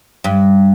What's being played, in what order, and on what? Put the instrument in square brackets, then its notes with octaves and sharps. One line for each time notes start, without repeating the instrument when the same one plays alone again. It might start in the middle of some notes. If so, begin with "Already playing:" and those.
[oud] G2